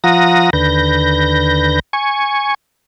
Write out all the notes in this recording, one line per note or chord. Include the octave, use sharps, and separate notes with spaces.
F3 F4 F#5 A#5 D#6 A#6
D#2 D3 B4 G6 A#6
G#5 C#6